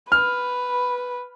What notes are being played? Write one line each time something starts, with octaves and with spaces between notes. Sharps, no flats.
B4 F6